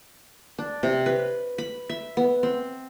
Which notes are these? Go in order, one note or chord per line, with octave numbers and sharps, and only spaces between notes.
D4
C3
B4
B5
E5
B3
C4